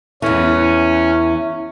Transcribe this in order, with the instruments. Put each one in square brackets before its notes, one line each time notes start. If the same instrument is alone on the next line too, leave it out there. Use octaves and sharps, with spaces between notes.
[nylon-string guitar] E2 E3 [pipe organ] C#4